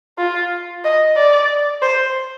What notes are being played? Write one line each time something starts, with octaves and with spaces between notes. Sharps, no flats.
F4
D#5
D5
C5